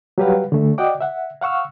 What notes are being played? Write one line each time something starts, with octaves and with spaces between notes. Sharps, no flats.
F#3 G3 G4 B4 F5 F#5
D3 A3
F#4 D5 D#5 F#5 G5 D6
E5 F#5
F5 F#5 C#6 E6 F6